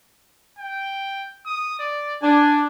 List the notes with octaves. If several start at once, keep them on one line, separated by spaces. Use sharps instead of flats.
G5
D#6
D5
D4 G#5